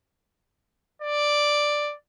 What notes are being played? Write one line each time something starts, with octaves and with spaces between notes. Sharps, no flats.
D5